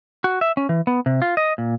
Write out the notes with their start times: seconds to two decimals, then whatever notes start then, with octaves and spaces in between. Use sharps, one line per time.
0.24 F#4
0.41 E5
0.57 C#4
0.69 E3
0.87 B3
1.06 C3
1.22 F4
1.37 D#5
1.58 A#2